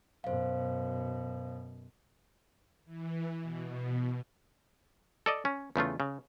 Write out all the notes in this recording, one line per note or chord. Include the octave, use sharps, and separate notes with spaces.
F#2 B2 C5 F5
E3
B2
A4 D5 D#5
C#4
E2 C#3 A3 F4
C#3